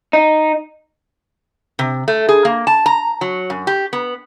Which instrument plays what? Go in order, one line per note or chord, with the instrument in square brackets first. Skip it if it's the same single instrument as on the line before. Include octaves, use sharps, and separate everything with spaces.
[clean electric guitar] D#4
[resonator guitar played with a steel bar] C3
A3
G#4
A#3
A5
A#5
F#3
F#2
G4
B3